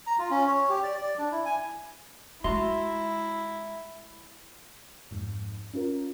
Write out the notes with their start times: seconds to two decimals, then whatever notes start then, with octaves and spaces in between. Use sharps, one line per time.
0.07 A#5
0.19 F4
0.31 C#4
0.47 C#5
0.69 G4
0.83 D5
0.97 D5
1.18 D4
1.32 E4
1.45 G#5
2.44 G#3 E4 F#4 E5 A#5 C6
5.11 F2 G#2
5.74 C#4 F4 A#4